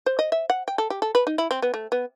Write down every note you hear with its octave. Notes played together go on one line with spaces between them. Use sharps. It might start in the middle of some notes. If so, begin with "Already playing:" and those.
C5
D#5
E5
F#5
G5
A4
G4
A4
B4
D#4
E4
C4
B3
A3
B3